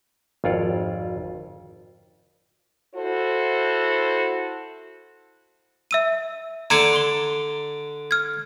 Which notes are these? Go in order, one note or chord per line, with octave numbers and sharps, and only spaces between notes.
G#1 F2 F4 C#5 D5
E4 F#4 A4 C5
E5 E6 D#7
D3 D4 A#5 G#6 C#7
C6 G7
F6 G#6